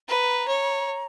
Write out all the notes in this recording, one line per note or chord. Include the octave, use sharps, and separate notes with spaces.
B4 A#5
C#5